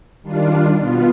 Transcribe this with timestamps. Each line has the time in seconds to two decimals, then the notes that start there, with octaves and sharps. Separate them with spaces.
0.23 D#3 G3 D4 F4
0.79 B2 B3 F4